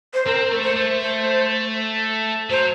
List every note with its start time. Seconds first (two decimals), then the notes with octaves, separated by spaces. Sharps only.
0.14 C5
0.27 C4 A#4
0.51 A3
0.64 C5
0.76 A3
1.00 C5
2.50 F#3 C5